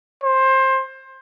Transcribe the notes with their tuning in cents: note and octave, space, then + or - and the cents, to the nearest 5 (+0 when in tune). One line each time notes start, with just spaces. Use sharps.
C5 +20